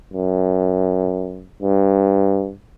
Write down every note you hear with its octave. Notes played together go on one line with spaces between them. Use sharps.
F#2
G2